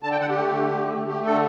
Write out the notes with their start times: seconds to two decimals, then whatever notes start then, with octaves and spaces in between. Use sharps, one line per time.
0.03 D3 A5
0.11 G5
0.20 D3 F#5
0.29 G4
0.38 A3
0.55 D3
0.72 A3
0.90 A3
1.07 A3 G4
1.25 D3 A4